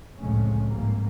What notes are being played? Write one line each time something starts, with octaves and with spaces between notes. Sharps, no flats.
C2 F2 A2 C#3 G#3 C#4
F1 G#2 G3 A#3